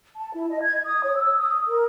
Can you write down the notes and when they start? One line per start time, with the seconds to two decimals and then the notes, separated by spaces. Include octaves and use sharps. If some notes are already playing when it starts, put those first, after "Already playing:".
0.17 A5
0.34 E4
0.49 D#5
0.63 G#6
0.85 D#6
1.03 C#5
1.17 E6
1.38 D#6
1.68 A#4